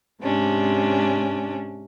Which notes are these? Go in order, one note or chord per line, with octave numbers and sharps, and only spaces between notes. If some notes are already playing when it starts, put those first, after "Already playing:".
G#2 C3 C#4 D4